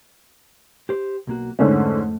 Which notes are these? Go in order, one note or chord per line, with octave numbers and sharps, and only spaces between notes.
G4 C5
B1 A#3 F#4
F2 G#2 D3 A3 C#4